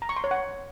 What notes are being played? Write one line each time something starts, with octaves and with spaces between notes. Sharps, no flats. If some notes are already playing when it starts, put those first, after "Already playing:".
A#5
C#6
C6
C#5
F#5